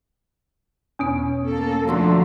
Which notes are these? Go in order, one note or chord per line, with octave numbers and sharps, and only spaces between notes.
E2 B2 B3 C#4
A#3 A4
D3 F3 A3 F#4 A#5 C6 E6